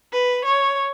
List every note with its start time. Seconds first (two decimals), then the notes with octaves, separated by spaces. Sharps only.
0.13 B4
0.45 C#5